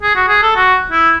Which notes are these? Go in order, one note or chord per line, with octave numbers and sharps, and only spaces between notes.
G#4
F#4
G#4
A4
F#4
E4